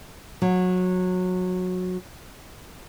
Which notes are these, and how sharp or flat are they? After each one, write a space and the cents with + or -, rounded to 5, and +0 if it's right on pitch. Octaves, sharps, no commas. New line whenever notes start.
F#3 -20